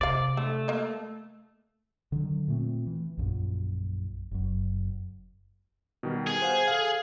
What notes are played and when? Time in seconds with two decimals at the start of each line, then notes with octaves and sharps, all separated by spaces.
0.01 C3 C5 D5 F5
0.37 D3 A3
0.68 A#3 D#5
2.12 D3 D#3 F#3
2.48 A#2 A3 C4
2.87 E3
3.17 A#1 F#2 A#2
4.31 F#1 F#2
6.03 B2 D#3 G3
6.27 G#4
6.42 C5 F5 F#5
6.68 A4 F5